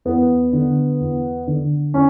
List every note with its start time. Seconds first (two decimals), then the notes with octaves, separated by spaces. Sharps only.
0.05 E2 B3
0.53 D3
1.00 E2
1.47 D3
1.94 C#4